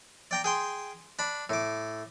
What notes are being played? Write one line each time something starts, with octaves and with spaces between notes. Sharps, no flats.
D5 G5 A#5
G#4 G5 C6
D4 B5
A2 D6